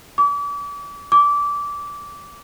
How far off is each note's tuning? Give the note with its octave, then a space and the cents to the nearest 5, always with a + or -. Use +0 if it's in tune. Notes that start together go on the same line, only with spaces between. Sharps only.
D6 -40
D6 -20